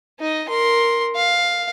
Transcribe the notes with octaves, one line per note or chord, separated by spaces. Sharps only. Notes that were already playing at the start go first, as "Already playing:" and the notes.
D#4 D#5
A#4 C6
F5